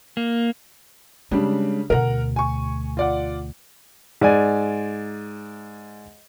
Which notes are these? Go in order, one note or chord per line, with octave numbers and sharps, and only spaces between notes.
A#3
C#3 G3 G#3 D4
D2 B2 A#4 F#5
G#5 C#6
F4 D5 F#5
G#2 D5 G#5